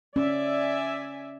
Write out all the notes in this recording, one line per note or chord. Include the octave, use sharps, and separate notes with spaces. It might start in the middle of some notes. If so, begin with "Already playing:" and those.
C#4 D5 E5 G#5